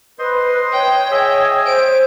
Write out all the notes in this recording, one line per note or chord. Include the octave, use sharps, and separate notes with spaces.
B4 C5 D#5 C6
C#5 G5
G#4 C#5 D#5 E5
C5 D7